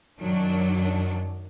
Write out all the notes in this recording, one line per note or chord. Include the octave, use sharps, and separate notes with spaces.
F#2 D#3 F#3 D4